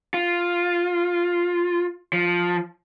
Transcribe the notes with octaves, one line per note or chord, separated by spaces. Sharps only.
F4
F3